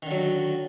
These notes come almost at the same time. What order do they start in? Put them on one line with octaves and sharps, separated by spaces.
D#3 D3 F#3